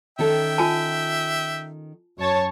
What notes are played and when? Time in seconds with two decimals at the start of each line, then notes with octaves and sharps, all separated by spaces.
0.19 D#3 C#4 A4 E5 G5
0.58 F4 G#5 A5
2.18 F#2 C#5 A5